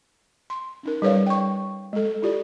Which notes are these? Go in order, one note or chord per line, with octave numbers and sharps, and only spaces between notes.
C6
C#4 D#4 A#4
G3 G#4 B4 C#5 D5 F5
G5 C#6
G#3 A4
E4 F4 G4 D5